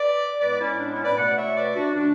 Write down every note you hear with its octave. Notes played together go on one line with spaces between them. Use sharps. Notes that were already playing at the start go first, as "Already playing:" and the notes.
Already playing: B4 D5
A2 G#3 B3 B4 D5
C#4 E4
D4
C#4 E4
B4 D5
B2 A3 D5 F#5
C#5 E5
B4 D5
D4 F#4
D3 A3 D4